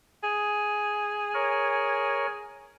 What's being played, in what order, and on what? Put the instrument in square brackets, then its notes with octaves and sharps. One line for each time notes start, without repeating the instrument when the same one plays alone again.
[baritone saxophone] G#4
[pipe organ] A#4 C#5